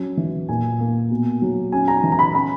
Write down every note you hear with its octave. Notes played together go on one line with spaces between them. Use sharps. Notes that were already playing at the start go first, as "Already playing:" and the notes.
Already playing: F#3 C#4
E3
A#2 G#5
A#3
B2
F#3
C#4 G#5
A#5
E3
A#5
B5
C#4 B5